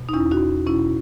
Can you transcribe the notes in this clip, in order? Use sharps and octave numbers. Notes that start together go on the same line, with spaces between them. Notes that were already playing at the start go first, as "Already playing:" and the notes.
Already playing: B2
D#4
E2 C#4 E4
D#4 F#4
E2
B2 C#4 E4